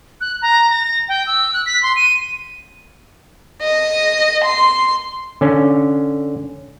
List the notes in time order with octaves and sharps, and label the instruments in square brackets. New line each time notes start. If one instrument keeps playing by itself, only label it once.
[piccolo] F#6
A#5
A#6
G5
E6
F#6
B6
C6
D#7
[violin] D#5
C6
[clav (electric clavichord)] D3 C#4